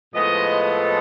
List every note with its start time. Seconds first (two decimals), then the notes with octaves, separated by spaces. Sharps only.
0.13 A2 F3 G#3 B3 D#5
0.65 A4